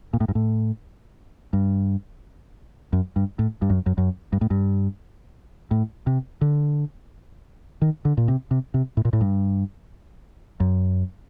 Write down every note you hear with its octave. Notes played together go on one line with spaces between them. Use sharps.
A#2
A2
G2
A2
G2
F#2
G2
A2
G2
F#2
F#2
F#2
G2
A2
G2
A2
C3
D3
D#3
D3
A#2
C3
C3
C3
A2
A#2
A2
G2
F#2